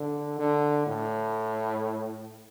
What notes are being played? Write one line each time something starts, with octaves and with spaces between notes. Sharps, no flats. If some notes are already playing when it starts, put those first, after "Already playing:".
Already playing: D3
D3
A2